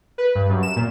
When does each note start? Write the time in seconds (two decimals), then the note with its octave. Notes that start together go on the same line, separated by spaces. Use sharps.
0.18 B4
0.35 G2
0.49 F#2
0.63 E7
0.76 A#2